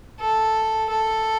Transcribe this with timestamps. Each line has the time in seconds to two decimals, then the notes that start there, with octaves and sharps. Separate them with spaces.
0.20 A4
0.89 A4